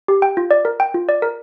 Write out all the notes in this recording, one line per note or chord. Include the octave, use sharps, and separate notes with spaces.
G4
G5
F4
D5
A#4
G5
F4
D5
A#4